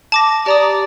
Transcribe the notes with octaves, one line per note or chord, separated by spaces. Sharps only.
A5 D6 A#6
G4 D5 A#5 D#6